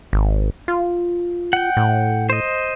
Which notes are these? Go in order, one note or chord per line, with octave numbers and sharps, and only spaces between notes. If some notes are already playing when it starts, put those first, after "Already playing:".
G#1
F4
F#5 G5
A2
C5 D#5